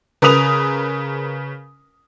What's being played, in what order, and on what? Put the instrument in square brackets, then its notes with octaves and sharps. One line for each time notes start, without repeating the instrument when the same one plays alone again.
[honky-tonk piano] C#3 A#4 B4 D#6 F7